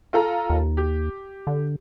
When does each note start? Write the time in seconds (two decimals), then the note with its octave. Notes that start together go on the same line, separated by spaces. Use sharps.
0.13 F4 A4 A#5
0.50 D#2
0.77 G4
1.47 D3